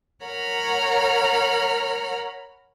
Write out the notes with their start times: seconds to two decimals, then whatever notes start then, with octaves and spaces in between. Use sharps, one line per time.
0.24 A#4 C#5 F#5 A#5 B5 F6